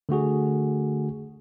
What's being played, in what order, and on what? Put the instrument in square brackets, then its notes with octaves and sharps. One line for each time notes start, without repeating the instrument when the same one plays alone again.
[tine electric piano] D3 A3 F#4 G#4